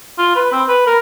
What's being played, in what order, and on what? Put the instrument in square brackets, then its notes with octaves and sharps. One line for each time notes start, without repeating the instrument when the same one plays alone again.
[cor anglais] F4
B4
C4
B4
A#4